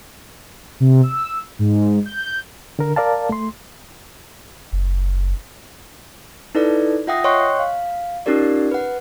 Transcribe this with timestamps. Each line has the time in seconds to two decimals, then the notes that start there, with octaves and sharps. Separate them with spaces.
0.80 C3
1.03 E6
1.59 G#2
2.06 G6
2.79 D3 A#4
2.96 A#4 D5 F5 A5
3.29 A3 C6
4.73 F#1
6.55 D#4 E4 A4 B4 D5
7.07 F4 E5 F#5 G5 D#6 A#6
7.24 C#5 D#5 G5 C6 C#6 F#6
7.59 F5
8.26 C#4 D#4 F4 G4 A#4 D5
8.71 B4 F#5